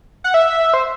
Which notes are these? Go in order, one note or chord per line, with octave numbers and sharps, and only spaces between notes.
F#5
E5
C5